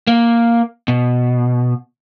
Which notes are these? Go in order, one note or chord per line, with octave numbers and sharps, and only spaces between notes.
A#3
B2